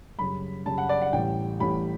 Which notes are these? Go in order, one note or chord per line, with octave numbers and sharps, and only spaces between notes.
F#2 C#3 G3 B5
F#2 C#3 G3 A5
F#5
D5
F#5
A1 A2 G3 G5
A1 A2 G3 B5